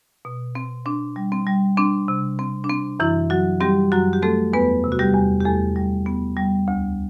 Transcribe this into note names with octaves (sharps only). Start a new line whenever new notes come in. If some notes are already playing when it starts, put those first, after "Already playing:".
B2
C4
C4 D4
G3
C4
G3
C4 D4
C3
C4
D4
C4
F#2 E3 E4
F#3 F#4
G3 C4 G4
F#2 F#3 F#4
G4
A3 C4 A4
E2 B3 B4
C3
F#4
G3 G4
E2
G4
E2 A3 A4
G3
B3
G3
D2